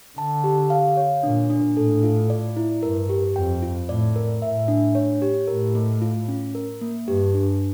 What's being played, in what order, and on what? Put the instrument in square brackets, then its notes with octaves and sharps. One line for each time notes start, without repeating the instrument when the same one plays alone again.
[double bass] D3 [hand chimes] A5
[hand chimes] G4
F5
C#5
[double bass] A#2 [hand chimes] D4
[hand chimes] D4
[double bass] A2 [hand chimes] A4
[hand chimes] F4
D5
E4
[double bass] G2 [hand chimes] A#4
[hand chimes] G4
[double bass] F2 [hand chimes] G5
[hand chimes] F4
[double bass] A2 [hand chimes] D5
[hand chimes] A#4
[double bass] A2 [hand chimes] E5
[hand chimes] D4
C#5
G4
[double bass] A2 [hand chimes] A#4
[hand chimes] A3
F4
C#4
A#4
A#3
[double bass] G2 [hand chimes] G4
[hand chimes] D4